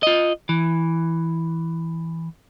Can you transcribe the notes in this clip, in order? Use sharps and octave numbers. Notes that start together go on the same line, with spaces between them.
F4 D#5
E3